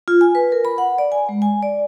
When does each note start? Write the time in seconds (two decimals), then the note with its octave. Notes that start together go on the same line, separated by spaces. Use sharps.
0.08 F4
0.21 G#5
0.35 B4
0.52 A#4
0.65 B5
0.78 F#5
0.98 D5
1.12 G#5
1.29 G#3
1.42 G#5
1.63 D5